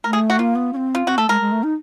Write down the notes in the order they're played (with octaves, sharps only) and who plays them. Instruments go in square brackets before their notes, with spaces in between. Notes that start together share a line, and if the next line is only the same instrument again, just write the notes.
[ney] A3 [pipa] A#4
[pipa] G#4
F#4
[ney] A#3 [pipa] F4
[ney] B3
C#4
C4
[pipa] F4
[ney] C4 [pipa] F#4
[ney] A3 [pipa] A4
[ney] G#3 [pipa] A#4
[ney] G#3
A3
D#4